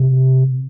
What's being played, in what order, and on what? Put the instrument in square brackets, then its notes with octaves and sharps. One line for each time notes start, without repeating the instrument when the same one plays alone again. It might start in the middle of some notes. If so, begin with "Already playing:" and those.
Already playing: [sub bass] C3